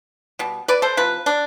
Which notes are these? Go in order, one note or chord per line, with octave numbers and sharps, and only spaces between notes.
B2 G3
B4 D5
A4 C5
C3 F3 B4
D4